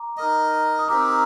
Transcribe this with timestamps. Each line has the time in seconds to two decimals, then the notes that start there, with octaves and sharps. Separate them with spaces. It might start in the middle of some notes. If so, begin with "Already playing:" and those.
Already playing: A#5 D6
0.17 D#4 A#4 D#5
0.79 D#6
0.88 C4 D#4 G4 A#4 A#5 D6